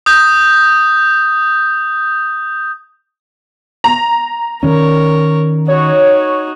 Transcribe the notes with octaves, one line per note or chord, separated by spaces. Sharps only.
D#6 G6
A#5
D#3 C#4 A#4 C#5
D#4 F#4 C#5